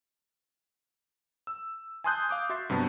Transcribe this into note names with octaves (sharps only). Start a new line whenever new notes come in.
E6
G#5 A5 C6 D#6 F#6 G6
F5 D6 D#6
F#4 E5 C6 A6 C7
G2 C3 F#3 B3 A5